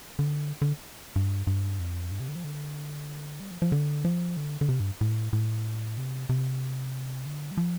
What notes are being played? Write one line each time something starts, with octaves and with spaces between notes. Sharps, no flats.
D3
D3
G2
G2
F2
G2
C3
D3
F3
D3
G3
F3
F3
D3
F3
D3
D3
C3
G2
A2
A2
C3
C3
D3
G3
F3